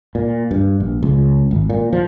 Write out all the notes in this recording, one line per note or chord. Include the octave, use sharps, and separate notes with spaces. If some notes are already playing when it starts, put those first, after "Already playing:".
A#2
G2
A#1
C#2
G#1
A#2
F3